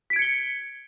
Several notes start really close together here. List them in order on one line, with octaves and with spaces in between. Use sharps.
B6 D7 G#6 C#7 G7